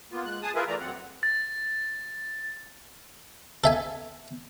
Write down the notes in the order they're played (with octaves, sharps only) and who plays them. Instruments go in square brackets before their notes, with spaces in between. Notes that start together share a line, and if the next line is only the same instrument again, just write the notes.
[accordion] A#3 B3 F4
G#3 F#6
G#4 G#5 A5 D#6
E4 F4 G#4 A#4 B4 E5
E3 A3 D5 A#5
F#2 C4 F#5
[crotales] A6
[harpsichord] A4 E5 G#5